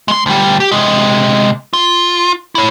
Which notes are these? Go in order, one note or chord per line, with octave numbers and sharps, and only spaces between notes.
G#3 C6
D2 G3
G4
C3 G#3
F4
E4 C#5